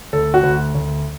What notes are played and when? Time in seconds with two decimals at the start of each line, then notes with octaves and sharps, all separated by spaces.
0.13 D2 A4
0.34 F#4
0.43 D2
0.75 D2